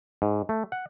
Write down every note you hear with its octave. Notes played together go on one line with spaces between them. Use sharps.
G#2
A3
F#5